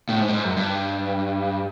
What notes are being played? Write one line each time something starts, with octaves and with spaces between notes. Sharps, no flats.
A2
G#2
A2
G#2
F#2
G2